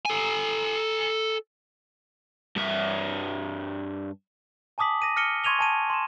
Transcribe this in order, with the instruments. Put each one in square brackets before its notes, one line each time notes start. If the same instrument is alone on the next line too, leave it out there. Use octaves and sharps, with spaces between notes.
[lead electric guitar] A4 G#5
[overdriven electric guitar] G2 E5
[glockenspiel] G#5 A5 D6 D#6 B6 F#7
D6 A#6 D#7
F6 A#6 C#7 D#7 G7
C6 C#6 G#6 D#7 F7 G7
G#5 A5 D#7
C6 E7